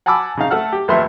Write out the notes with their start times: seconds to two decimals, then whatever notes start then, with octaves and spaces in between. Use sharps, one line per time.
0.06 F#5 G#5 A5 B5 D6 E6
0.37 C#3 D#4 F5
0.50 A3 A4 F#5 F6
0.73 G4
0.88 A#1 D#2 A3 B4 E5 C6